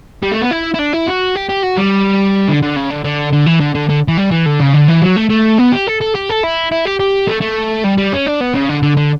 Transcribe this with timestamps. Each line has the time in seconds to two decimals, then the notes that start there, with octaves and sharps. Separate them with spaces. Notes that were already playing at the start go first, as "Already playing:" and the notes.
0.23 G3
0.32 A3
0.41 B3
0.51 E4
0.74 E4
0.79 D4
0.93 E4
1.07 F#4
1.35 G4
1.49 G4
1.64 F#4
1.77 G3
2.48 D3
2.62 D3
2.76 C#3
2.90 D3
3.04 D3
3.33 D3
3.46 E3
3.60 D3
3.75 D3
3.89 D3
4.08 E3
4.17 G3
4.31 E3
4.46 D3
4.60 C#3
4.73 D3
4.88 E3
5.02 F#3
5.17 A3
5.30 A3
5.59 B3
5.72 G4
5.87 A4
6.01 A4
6.15 G4
6.29 A4
6.43 E4
6.72 E4
6.85 G4
7.00 G4
7.28 A3
7.41 A3
7.84 G3
7.98 G3
8.13 C#4
8.26 D4
8.40 B3
8.54 C#3
8.69 D3
8.83 D3
8.97 D3